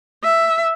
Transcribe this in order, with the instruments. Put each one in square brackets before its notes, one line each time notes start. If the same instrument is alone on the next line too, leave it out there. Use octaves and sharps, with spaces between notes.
[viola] E5